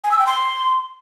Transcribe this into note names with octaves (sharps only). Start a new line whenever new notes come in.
G#5
E6
G5
C6